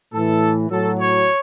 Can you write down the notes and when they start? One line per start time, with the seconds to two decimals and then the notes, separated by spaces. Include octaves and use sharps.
0.12 A2 E3 A4
0.70 A2 F#3 A4
0.99 C#5